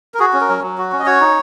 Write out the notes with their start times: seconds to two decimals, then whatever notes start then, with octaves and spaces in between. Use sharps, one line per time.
0.14 A#4
0.19 F#4 G#4
0.33 C#4
0.41 A#4
0.49 F#3
0.62 F#3
0.78 F#4
0.92 C#4
0.99 D#5
1.06 F#4 C#5
1.20 D#4